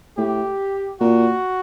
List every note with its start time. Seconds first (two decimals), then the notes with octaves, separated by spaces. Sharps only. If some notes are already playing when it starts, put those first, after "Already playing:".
0.17 A2 G4
1.00 A#2 F#4